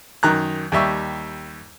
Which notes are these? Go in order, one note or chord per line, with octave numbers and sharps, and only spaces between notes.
F#2 D#3 A#5 F#6
D#2 G3 E5 C#6